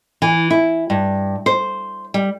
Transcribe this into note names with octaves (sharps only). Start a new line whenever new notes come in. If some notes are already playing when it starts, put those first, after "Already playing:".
E3
E4
G2
C5
G3